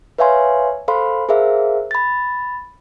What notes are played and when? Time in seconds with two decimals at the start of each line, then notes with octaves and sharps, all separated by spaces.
0.18 B4 C#5 E5 F5 G#5 C6
0.88 A4 C5 F5 B5 C6
1.29 G#4 A#4 C5 E5 F5
1.91 B5 A6